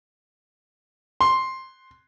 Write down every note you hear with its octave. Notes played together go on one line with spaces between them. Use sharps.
C6